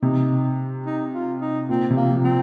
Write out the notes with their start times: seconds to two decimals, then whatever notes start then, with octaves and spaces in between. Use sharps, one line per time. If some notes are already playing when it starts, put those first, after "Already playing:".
0.02 C3 D#4
0.86 D#4
1.14 F4
1.41 D#4
1.69 A#2 C4
1.91 C3
1.97 A#3
2.10 F3
2.25 C4